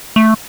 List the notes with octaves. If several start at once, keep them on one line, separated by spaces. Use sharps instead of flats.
A3